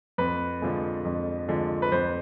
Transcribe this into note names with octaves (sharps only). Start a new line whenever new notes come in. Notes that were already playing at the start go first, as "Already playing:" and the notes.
F2 B4
D3 F3 G#3
F2
D3 F3 G#3
B4
F2 C5